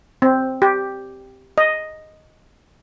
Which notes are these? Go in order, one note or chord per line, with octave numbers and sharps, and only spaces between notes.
C4
G4
D#5